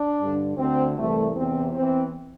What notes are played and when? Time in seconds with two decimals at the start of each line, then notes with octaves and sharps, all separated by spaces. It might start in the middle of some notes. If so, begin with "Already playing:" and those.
Already playing: D4
0.19 G2 D3
0.58 D2 D3 C4
0.97 C2 C3 E3 A3
1.36 E2 C3 E3 C4
1.75 E2 E3 C4